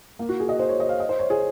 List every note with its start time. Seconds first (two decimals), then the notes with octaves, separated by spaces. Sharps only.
0.19 A#3
0.29 F#4
0.40 G#4
0.49 D#5
0.59 C5
0.69 C#5
0.80 D#5
0.89 F5
1.00 D#5
1.09 C5
1.19 C#5
1.30 G#4